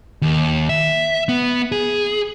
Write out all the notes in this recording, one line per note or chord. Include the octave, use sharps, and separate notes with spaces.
D#2
E5
B3
G#4